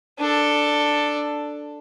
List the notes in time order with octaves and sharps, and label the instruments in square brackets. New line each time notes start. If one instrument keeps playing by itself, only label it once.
[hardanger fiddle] D4 A4